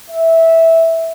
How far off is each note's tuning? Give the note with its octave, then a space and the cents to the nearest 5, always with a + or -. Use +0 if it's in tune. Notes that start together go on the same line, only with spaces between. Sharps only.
E5 -10